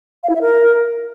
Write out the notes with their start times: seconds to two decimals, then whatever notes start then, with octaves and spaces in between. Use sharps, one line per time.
0.23 F5
0.29 E4
0.35 E5
0.41 A#4